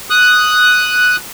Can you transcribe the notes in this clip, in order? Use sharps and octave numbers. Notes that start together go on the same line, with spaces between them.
D#6 F#6